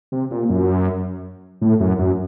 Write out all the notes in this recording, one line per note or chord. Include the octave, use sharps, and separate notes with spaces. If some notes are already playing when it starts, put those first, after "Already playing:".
C3
A#2
F#2
A2
F#2
F#2